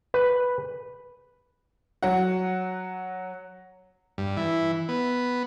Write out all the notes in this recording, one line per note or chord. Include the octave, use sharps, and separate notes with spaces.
B4
F#3 F#5
G2
E3
B3